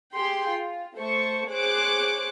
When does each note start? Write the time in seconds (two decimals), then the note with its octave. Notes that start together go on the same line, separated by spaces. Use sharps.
0.15 G4 G#4 G5 C6
0.48 F4
0.96 A3 A4 C5 C#6
1.48 G#4 C5 C#5 D6 F#6